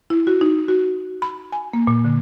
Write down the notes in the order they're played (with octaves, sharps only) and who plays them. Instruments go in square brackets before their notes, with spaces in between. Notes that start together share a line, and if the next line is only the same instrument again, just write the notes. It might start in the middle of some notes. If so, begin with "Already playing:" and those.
[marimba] E4
F#4
D#4
F#4
B5
G#5
A#3
A#2
D3